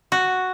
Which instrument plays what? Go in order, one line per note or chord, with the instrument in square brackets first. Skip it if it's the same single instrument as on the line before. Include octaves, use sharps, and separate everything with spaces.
[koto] F#4